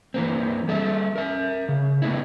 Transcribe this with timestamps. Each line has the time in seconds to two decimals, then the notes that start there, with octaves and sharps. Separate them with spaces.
0.14 E3 A#3 C4
0.68 G3 A4 E5
1.16 A#4 E5
1.69 C#3
2.02 A3 B3 D#4 E4